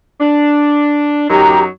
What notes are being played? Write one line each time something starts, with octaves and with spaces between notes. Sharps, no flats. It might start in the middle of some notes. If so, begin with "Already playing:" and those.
D4
F#2 F#3 D#4 G4 A#5